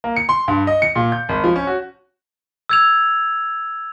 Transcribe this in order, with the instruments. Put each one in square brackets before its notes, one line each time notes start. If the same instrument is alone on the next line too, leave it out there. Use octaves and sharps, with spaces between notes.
[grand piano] A#3
C#7
C6
G2
D#5
C#7
A#2
G6
G#1
F3
C#4
F#4
[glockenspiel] E6 G#6 F7